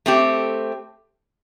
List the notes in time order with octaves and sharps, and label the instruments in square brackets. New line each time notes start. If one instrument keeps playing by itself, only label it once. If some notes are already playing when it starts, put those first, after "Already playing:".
[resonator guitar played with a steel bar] A3 C4 G4